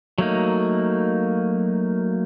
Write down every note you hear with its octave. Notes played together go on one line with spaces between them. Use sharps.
F#3 A3 A#3 D#4